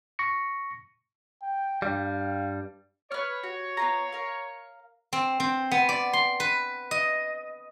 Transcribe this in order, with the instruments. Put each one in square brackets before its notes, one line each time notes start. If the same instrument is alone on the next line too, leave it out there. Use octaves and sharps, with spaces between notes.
[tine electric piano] C#6 A#6 C#7
[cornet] G5
[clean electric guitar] G2 G3 [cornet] F5
[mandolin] B4 F6 [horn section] C#5
[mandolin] F#4
B3 F4 A#5
A#4 F5
[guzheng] C4
C4
B3
D5
C6
B4
D#5